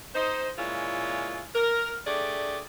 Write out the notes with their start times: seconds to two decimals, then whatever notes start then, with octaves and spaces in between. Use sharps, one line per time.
0.15 D#4 C5
0.58 A#2 G#3 C#4 E4 F4
1.55 A#4
2.07 A3 D4 G4 G#4 D5